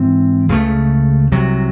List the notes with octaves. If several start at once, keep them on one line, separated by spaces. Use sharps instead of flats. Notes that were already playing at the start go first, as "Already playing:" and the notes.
Already playing: G#2 E3 C4
C#2 C#3 E3 A3
C2 C3 F#3